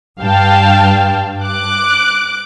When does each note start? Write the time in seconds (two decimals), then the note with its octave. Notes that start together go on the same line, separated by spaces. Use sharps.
0.20 G2 F5 G5 A5
1.42 D6 F#6 D7